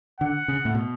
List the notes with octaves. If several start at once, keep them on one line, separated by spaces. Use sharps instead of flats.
D3 F#5
C#3
A2
B2